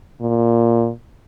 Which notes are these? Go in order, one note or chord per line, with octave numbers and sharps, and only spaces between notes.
A#2